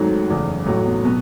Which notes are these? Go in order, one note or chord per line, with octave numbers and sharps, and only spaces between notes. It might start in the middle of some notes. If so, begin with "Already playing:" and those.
Already playing: G#1 G#2 D#3 F#3 A3
F#1 E2 C#3
A1 A2 F#3 A3
B3
B2 F#3 B3